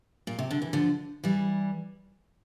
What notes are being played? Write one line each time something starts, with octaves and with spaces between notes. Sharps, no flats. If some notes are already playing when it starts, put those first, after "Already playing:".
A#2
C3
D3
E3
D3 F3
E3 G3